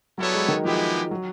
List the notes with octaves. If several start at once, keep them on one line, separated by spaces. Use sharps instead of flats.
F#3 G3 B3 E4 A4 C#5
G#3
D#3
F3 G#3 B3 E4 G4
F#3